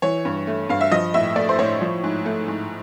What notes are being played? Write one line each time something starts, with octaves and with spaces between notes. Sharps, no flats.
E3 C#5
G2
A3
G2 F5
E5
F3 D#5
A2 E5
A3 D5
C5
A2 C#5
F3
G#2
A3
G#2